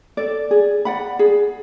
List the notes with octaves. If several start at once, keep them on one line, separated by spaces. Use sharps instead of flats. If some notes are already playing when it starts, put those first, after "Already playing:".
A4 D5
G#4
D5 F#5 B5
G#4